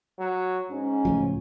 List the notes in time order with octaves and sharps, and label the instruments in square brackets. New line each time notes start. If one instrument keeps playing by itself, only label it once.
[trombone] F#3
[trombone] G#2 [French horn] C#4
[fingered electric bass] C#2 A2 F3